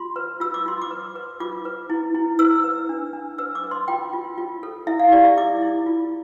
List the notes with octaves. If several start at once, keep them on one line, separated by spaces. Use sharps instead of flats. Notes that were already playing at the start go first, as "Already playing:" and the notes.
Already playing: F4 C6
B4
F4 E6
D6
F4 C6
D6
B4
B4
F4 D6
B4
E4
E4
B4 E6
B4
D4
D4
B4 E6
D6
B4
C6
F4 G5
F4
F4
A4
E4 E5
F5
G4 D5
E5
E4 D6
E4
F4